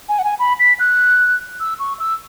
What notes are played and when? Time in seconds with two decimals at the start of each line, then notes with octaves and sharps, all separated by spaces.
0.09 G#5
0.19 F#5
0.24 G#5
0.39 B5
0.59 B6
0.80 F#6
1.60 E6
1.79 C#6
2.00 E6